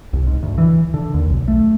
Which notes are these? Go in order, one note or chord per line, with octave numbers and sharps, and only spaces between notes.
C2
G#2
D2
E3
D3
D#2
B1
A3